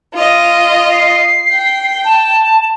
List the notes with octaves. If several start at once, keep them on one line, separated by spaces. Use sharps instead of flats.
F4 D#5
C7
G5
A5